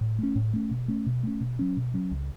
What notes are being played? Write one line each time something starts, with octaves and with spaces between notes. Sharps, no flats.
A2
A3 C#4
A2
A3 C#4
B2
A3 C#4
B2
A3 C#4
B2
F#3 C#4
B2
F#3 C#4
C#2